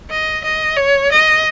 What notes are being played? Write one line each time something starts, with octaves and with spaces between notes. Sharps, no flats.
D#5
D#5
C#5
D#5